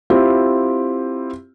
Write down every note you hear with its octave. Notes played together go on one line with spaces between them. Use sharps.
C4 E4 F4 G4